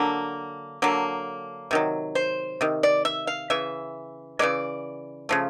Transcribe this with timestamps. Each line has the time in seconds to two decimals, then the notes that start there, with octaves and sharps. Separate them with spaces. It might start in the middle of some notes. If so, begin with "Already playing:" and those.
Already playing: D3 F#3 A#3
0.82 D3 F#3 A#3
1.71 C3 D#3 F#3
2.15 C5
2.61 C3 D#3
2.83 D5
3.05 E5
3.27 F5
3.50 C#3 E3 E5
4.39 C#3 E3 G#3 D5
5.29 C#3 F3 A3